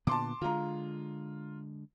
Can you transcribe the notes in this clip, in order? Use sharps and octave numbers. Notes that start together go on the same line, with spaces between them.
A#2 D3 B3 A5 C6 D6
D3 G#3 F4 A#5